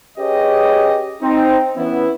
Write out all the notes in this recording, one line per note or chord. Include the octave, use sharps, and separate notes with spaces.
C#4 G4 G#4 B4 C#5 D#5
C4 D#4
E3 B3 C#4 E4